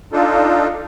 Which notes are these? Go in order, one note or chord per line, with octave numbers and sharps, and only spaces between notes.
D4 D#4 F4 A4